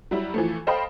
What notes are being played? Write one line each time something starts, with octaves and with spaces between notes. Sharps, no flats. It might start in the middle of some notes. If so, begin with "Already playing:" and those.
F#3 G3 E4
E3 F3 A3
A4 C5 D#5 F5 G5 B5